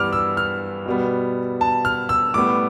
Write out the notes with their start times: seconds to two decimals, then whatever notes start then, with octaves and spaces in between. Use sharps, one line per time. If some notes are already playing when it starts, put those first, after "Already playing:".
Already playing: G2 E3 G3 B3 D6 F6
0.13 E6
0.37 F6
0.86 B2 G3 B3
1.61 A5
1.85 F6
2.09 E6
2.34 A2 G3 B3 D6